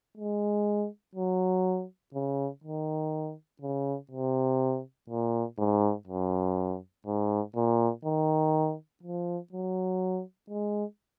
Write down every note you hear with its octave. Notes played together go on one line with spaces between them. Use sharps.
G#3
F#3
C#3
D#3
C#3
C3
A#2
G#2
F#2
G#2
A#2
D#3
F3
F#3
G#3